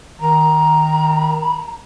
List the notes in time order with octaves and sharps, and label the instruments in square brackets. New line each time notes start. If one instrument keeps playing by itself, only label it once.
[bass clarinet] D#3 [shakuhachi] A#5